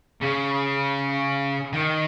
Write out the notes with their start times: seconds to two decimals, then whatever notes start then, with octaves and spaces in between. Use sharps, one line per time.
0.21 C#3
1.73 D#3